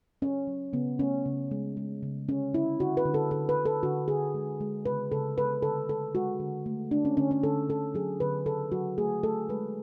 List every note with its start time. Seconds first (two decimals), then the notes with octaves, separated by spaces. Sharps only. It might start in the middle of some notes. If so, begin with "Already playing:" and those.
0.22 F#3 C#4
0.47 F#3
0.73 C#3 B3
0.99 A3 C#4
1.26 C#3
1.51 G#3
1.77 G#3
2.03 C#3
2.28 D3 C#4
2.54 D3 E4
2.80 D3 F#4
2.97 B4
3.05 D3
3.14 A4
3.31 D3 A4
3.49 B4
3.56 D3
3.66 A4
3.83 D3 F#4
4.08 D3 G#4
4.34 G#3
4.61 G#3
4.86 C#3 B4
5.12 C#3 A4
5.38 G#3 B4
5.62 D3 A4
5.89 G#3 A4
6.15 G#3 F#4
6.40 D3
6.66 A3
6.91 A3 D4
7.05 C#4
7.17 D3 C#4
7.31 C#4
7.43 D3 A4
7.69 D3 A4
7.94 F#3 G#4
8.20 D3 B4
8.46 C#3 A4
8.72 F#3 F#4
8.98 A3 G#4
9.23 A3 A4
9.49 G#3 B4